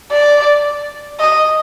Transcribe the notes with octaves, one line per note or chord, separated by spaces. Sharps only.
D5
D#5